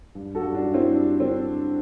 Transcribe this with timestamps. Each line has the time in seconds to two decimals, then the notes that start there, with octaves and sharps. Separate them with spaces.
0.15 G2
0.35 F#4 A4
0.41 G2
0.54 D4 F#4
0.67 G2
0.74 C4 E4
0.94 G3 D4
1.20 D3 C4